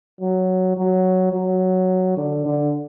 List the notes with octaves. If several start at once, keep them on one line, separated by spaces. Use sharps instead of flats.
F#3
F#3
F#3
D3
D3